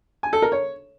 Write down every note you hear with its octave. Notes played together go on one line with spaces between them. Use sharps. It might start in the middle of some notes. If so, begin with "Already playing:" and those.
G#5
A4
A#4
C#5